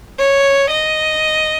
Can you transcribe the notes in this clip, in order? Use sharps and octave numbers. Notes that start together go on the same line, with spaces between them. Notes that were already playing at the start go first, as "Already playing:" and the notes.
C#5
D#5